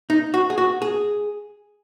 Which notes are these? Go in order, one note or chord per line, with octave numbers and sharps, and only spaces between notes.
D#4
F#4
G#4
F#4
G#4